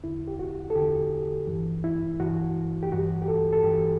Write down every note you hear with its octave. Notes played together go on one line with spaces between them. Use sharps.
E2 D3 E4
G4
F#4
A4
E2 D3 G4
G2 E3
E4
G2 E3 F#4
G4
G2 E3 F#4
G4
A4
A4
G2 E3 G4